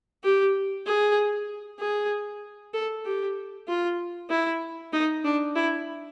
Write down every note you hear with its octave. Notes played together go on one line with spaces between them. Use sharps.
G4
G#4
G#4
A4
G4
F4
E4
D#4
D4
E4